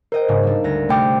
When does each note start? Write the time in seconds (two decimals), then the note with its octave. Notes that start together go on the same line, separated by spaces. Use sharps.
0.12 A#4 C5 D#5 G5
0.28 G#2 C#3 A#3
0.43 G3 D4
0.64 D2 A#6
0.89 C3 A3 G4 G5 D6